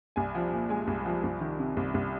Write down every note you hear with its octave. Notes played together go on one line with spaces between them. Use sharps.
C2 G#5
F3
A#2
G#3 G#5
C2
F3
C2
D#3
C3
C2
C2